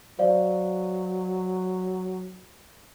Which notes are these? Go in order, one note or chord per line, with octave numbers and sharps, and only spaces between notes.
F#3 C5 D5 F5